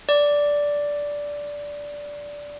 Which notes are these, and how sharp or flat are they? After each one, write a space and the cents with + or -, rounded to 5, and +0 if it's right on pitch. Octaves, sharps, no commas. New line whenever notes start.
D5 -10